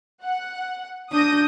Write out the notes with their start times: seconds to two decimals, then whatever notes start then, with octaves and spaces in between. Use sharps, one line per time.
0.23 F#5
1.13 D4 D#6 G6 A#6